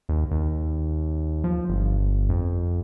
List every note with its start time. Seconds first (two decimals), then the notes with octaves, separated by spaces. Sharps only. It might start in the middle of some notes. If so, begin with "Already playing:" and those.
0.09 D#2
0.31 D#2
1.44 F3
1.69 G1
2.30 F2